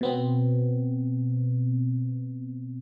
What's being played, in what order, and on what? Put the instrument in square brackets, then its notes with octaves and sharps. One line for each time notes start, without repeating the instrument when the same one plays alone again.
[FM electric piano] B2 B3 C4